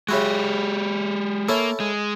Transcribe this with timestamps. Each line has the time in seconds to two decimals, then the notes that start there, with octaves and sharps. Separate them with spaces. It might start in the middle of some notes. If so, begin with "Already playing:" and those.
0.09 C#3 G#3 E4 F#4 G4
1.48 A#3 C#4 E4 A4
1.80 G#3